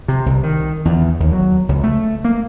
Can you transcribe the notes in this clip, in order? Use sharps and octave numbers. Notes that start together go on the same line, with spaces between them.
C3
C2
D#3
E2
D#2
F#3
C#2
A3
A#3